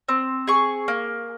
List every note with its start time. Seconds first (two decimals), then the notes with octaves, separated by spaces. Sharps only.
0.09 C4
0.47 G#4 C#6
0.88 A#3